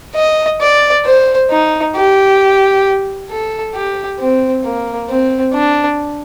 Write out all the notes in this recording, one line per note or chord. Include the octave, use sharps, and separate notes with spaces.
D#5
D5
C5
D#4
G4
A4
G4
C4
A#3
C4
D4